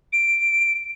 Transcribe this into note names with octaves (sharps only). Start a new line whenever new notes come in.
D7